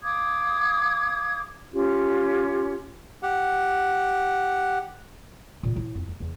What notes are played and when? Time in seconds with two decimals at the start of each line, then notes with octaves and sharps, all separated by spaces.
0.03 F5 D6 D#6 G#6
1.73 C#4 F4 G4
3.23 G4 F#5
5.63 A#2 D#3
5.75 F#3 E4
5.95 F2
6.09 D#2
6.20 E2